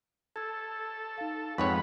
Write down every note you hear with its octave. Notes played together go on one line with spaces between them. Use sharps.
A4 E6 G#6
D#4 F5
F2 G#2 B4 C#5 F#5 B5 C#6